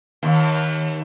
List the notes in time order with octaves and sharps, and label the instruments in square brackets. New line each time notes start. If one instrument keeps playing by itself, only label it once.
[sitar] D#2